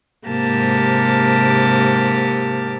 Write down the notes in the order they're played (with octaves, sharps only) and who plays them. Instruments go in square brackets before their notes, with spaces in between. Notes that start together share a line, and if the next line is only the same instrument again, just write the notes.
[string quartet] G#2 C3 A#3 G4 A5